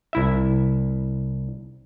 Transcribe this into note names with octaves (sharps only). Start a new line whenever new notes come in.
C2 E4 E5